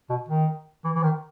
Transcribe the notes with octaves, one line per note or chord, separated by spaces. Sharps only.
B2
D#3
E3
E3
D#3